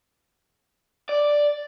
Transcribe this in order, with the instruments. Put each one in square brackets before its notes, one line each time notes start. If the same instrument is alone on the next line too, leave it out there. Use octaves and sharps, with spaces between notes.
[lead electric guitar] D5